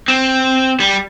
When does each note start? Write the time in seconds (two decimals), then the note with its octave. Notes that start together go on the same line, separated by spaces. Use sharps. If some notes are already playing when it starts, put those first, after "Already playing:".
0.08 C4
0.80 G3